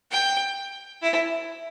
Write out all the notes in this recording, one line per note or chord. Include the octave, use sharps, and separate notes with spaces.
G5
E4